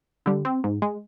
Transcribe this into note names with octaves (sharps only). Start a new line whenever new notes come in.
D3 G3
C4
G#2
G#3